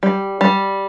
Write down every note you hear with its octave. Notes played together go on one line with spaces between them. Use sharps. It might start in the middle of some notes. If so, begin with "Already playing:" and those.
G3
G3